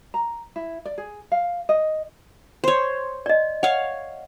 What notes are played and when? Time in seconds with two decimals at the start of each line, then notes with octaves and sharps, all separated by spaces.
0.14 A#5
0.56 E4
0.85 D5
0.98 G#4
1.32 F5
1.69 D#5
2.64 C5 C#5
3.26 D5 D#5
3.63 C#5 F5 F#5